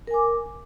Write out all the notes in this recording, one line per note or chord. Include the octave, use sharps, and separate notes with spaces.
A#4 G#5 D6